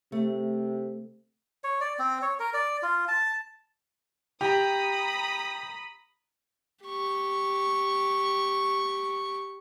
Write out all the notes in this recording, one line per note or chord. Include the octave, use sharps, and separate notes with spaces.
C3 A3
C#5
D5
C4
C#5
A#4
D5
F4
A5
G4 A#5 B5 D#6
G4 C#6